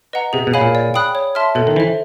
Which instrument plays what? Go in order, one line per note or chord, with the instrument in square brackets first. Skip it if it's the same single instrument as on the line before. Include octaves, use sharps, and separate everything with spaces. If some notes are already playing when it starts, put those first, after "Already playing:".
[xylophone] B4 D#5 F#5 A#5
[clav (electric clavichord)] C3 [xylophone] G#4
[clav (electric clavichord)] B2
[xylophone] C#5 F5 G#5 B5
[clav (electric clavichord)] A#2
[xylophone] D5
G5 B5 D#6 F#6
C#5
E5 A5 C6 F6
[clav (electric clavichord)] B2 [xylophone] A4
[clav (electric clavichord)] D#3
[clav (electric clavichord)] E3 [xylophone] C5 E5